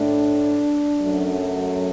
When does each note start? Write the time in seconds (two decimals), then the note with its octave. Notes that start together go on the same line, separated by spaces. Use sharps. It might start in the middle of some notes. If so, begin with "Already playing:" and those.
Already playing: A2 A3 D4
1.00 F#2 F#3 A3